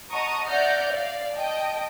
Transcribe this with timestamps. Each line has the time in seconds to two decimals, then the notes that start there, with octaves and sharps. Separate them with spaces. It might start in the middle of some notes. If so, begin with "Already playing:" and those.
0.12 D#5 F#5 A5 A#5 C#6 D#6
0.47 D5 E5 F#5 F6 G6 A#6
0.93 D5 F5
1.34 D#5 G5 A5